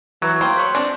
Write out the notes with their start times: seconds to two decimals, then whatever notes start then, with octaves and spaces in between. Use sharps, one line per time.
0.22 E3 F#3
0.41 A#3 C5 G5
0.57 B4 C#5
0.75 C4 D4